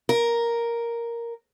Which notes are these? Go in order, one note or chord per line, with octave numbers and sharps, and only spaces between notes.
A#4